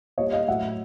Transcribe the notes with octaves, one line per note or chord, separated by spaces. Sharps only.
A#2 G3 C#5 D#5
D#5 F5
A2 F#3 E5 F#5